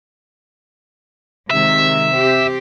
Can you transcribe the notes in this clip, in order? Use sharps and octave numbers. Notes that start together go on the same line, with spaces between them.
C3 D#3 G#3 E5
C4 G4